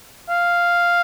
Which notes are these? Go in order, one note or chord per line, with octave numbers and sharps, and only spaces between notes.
F5